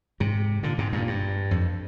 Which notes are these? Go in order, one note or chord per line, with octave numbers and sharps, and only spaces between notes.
G#2 C3
A#2 D3
G#2 C3
G2 A#2
G2
F2